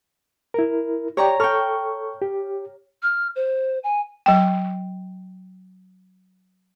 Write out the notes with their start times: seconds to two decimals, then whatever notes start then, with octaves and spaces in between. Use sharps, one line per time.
0.54 E4 A#4
1.17 G4 C#5 D5 G5 A#5 C#6
1.40 A4 G5 C#6 F6
2.22 G4
3.03 F6
3.36 C5
3.84 G#5
4.26 F#3 G5